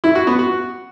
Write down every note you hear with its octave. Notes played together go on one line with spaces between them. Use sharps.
E4
F#4
B3
F#4